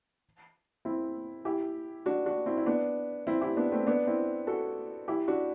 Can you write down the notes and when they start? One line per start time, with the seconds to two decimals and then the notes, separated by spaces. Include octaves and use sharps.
0.85 C4 E4
1.45 E4 G4
2.06 D4 F#4
2.26 D4 F#4
2.46 C4 E4
2.57 E4
2.66 B3 D4
3.27 C4 E4
3.41 E4 G4
3.57 B3 D4
3.72 A3 C4
3.87 B3 D4
4.07 C4 E4
4.47 F#4 A4
5.08 E4 G4
5.28 D4 F#4